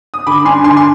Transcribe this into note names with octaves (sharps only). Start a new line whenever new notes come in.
D#6
D3 B5 D6
G2 G#5 C6
D3 G#5 C6
C6